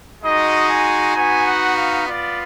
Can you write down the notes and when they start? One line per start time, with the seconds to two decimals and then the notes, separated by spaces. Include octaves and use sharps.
0.22 G#3 D#4 F#4 D#5
0.69 G#5
1.14 B3 D#4 F#4 G#5
1.46 F#5
1.77 F5
2.07 B3 F4 D5